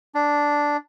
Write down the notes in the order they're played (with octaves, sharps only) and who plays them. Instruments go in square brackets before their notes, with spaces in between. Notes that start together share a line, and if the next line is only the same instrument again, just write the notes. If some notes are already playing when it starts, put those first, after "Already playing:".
[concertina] D4